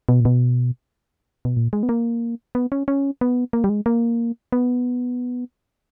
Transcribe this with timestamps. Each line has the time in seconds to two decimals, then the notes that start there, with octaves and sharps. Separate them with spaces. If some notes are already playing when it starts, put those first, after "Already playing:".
0.09 B2
0.20 A#2
0.25 B2
1.45 B2
1.57 A#2
1.73 G#3
1.83 B3
1.89 A#3
2.55 B3
2.72 C#4
2.88 C#4
3.21 B3
3.53 A#3
3.64 G3
3.69 G#3
3.86 A#3
4.52 B3